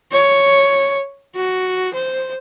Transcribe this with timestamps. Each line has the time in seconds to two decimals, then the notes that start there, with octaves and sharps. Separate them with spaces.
0.12 C#5
1.35 F#4
1.93 C5